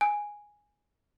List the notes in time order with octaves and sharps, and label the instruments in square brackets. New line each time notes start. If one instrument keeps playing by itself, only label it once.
[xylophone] G#5